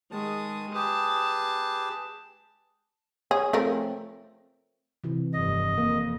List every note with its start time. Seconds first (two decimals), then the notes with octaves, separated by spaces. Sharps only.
0.12 D#3 G#3 A5 D#6
0.75 G4 G#4 B4 A5
3.31 G#4 C#5
3.53 F3 A3 C4 A#4
5.04 C3 E3
5.33 F1 G2 D#5
5.78 F2 A#3